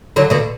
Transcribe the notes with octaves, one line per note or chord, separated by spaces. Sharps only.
D3 F#3
B2 D3